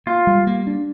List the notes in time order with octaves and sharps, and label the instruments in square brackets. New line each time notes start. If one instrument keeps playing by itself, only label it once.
[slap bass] A#3 [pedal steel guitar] F4
[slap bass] G3
A#3
D4